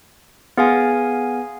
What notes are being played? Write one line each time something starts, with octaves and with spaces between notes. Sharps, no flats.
B3 G#4 F5 G#5